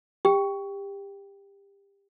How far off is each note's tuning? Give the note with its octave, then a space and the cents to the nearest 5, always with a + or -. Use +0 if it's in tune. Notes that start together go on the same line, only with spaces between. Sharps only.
G4 +25 G5 +0